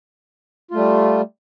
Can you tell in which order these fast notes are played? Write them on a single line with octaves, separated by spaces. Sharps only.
F4 A3 G3